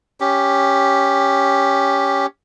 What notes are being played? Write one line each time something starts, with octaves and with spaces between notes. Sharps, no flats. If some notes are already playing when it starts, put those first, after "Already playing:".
C#4 G4